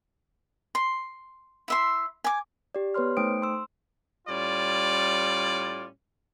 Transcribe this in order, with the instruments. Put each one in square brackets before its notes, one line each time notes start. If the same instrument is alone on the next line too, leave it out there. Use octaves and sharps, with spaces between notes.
[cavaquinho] C6
E4 E5 C6
G#5 D6
[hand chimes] G4 D5
B3 B4 C#5 C6 F6
A3 D#4 C5 G5 D#6 D7
C6 E6
[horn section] A2 G3 C#4 F4 D5